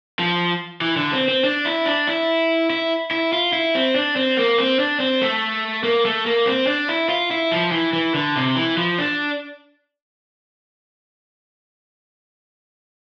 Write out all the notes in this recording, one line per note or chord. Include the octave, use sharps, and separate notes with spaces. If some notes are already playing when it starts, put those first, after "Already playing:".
F3
E3
D3
C4
C4
D4
E4
D4
E4
E4
E4
F4
E4
C4
D4
C4
A#3
C4
D4
C4
A3
A#3
A3
A#3
C4
D4
E4
F4
E4
F3
E3
E3
D3
C3
E3
F3
D4